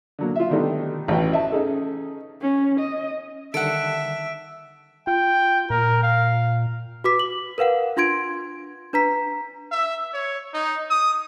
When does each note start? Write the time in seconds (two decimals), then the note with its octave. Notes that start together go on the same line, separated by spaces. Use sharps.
0.19 D3 F#3 A#3
0.36 F4 E5
0.49 B2 D3 D#3 G3 A3 B3
1.08 A1 C#3 F#4 B4 G5
1.31 D#5 E5 A5
1.52 C#4 D#4 G#4 A4
2.42 C#4
2.80 D#5
3.54 D3 D#3 G3 A4 E5 F#5 D7
5.07 F4 G5
5.70 A#2 A#4
6.03 F5
7.04 F#4 B4 D6 B6
7.19 F#7
7.58 A#4 B4 F5 F#5
7.97 D4 F4 C6 G#6 D7
8.93 D4 B4 A#5 B6
9.72 E5
10.13 C#5
10.54 D#4
10.90 D#6